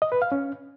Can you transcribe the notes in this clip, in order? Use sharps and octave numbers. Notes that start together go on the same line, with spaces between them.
D#5
B4
F5
C#4